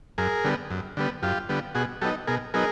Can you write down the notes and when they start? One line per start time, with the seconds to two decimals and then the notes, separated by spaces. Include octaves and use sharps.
0.18 F#2 G#4 A#4
0.44 D3 G3 B3
0.71 F#2
0.97 D3 G3 B3
1.23 F#2 F4 G4
1.49 D3 G3 B3
1.75 B2 F#4 G#4
2.01 F#3 B3 D#4 G4 A4
2.27 B2 G#4 A#4
2.54 F#3 B3 D#4 G#4 A#4